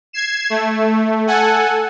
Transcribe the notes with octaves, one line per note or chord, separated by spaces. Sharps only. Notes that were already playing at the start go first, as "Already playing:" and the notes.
G#6 C7 E7
A3
A4 F#5 G#5